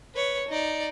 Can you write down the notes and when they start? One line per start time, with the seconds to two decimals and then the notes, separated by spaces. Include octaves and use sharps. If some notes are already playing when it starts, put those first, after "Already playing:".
0.15 B4 C#5
0.48 D#4 D5